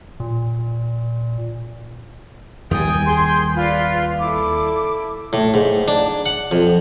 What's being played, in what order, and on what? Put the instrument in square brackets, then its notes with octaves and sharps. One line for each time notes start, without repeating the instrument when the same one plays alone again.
[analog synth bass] A#2
[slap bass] D#2 G3 [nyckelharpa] G5 G#5 [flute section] D#6
[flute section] G#4 C6
[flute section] F4 [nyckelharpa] B4 D5
[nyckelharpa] E4 A4 [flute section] D6
[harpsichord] A2
G#2
D4
F#5
F2